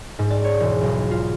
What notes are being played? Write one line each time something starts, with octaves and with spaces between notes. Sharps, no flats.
G#2
D5
C#5
E1
B1
F4